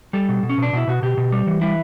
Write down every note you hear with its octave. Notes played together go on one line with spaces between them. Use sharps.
G3 A4
B2
B2
C#4
B2 D4
B2 E4
B2 F#4
B2 G4
B2
G3
E3
G3 E4